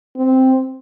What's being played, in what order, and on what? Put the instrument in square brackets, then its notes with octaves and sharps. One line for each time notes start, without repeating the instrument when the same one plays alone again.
[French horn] C4